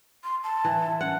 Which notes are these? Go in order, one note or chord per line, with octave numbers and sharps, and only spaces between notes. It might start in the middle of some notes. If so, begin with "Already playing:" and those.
C6
A5
E3
C#4 F#5